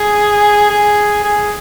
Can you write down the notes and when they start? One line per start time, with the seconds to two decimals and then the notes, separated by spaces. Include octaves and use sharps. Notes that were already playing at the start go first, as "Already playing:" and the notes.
Already playing: G#4
0.70 G#4
1.24 G#4